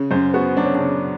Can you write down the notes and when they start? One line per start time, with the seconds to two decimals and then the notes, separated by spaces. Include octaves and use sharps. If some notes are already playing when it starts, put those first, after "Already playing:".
Already playing: C#3
0.11 F#2 C5
0.34 B3 F#4
0.57 F#3 D4
0.65 C#4
0.75 C#3 D4